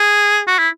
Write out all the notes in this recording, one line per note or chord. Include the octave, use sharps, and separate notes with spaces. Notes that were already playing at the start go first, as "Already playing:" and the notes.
Already playing: G#4
F#4
E4